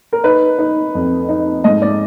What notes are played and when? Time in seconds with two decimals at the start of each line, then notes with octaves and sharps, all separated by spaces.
0.13 A#4
0.24 D#4 B4
0.59 D#4
0.95 F2
1.29 D#4
1.64 G#2 D#5
1.82 D5